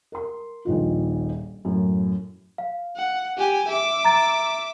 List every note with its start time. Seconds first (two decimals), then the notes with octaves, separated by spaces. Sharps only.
0.12 A#4 C6
0.65 D#1 A#1 D#3 F4
1.65 F#2 A2
2.58 F5
2.96 F#5
3.37 G4 G#5
3.68 E5 D6
4.05 A#5 A6